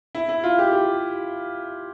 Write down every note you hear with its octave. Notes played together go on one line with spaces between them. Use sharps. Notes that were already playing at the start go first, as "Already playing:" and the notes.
E4
E4
F4
G4
G4